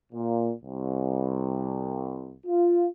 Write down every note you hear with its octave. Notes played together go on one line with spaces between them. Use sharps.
A#2
C2
F4